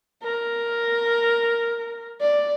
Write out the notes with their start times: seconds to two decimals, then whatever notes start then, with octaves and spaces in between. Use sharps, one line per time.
0.23 A#4
2.21 D5